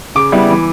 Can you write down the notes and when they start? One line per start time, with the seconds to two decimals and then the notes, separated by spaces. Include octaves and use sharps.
0.15 C#3 D6
0.32 G3 B3 E4
0.50 E3